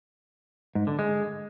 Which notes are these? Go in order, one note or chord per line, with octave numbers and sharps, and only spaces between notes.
G#2
D3
G#3